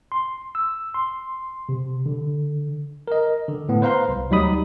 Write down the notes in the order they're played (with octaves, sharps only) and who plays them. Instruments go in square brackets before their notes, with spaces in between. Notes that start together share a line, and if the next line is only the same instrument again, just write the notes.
[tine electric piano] C6
E6
C6
C3
D3
A#4 D#5
D3
A2 B3
B4 C5 F5 A#5 C6
C2
D2 F#3 G3 D#4 B5 D#6